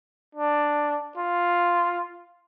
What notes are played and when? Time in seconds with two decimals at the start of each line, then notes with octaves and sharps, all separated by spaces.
0.35 D4
1.17 F4